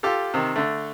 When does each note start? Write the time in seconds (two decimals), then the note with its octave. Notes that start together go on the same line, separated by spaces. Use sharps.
0.03 F4 G4 A4
0.34 C3 D#3
0.56 D3 A3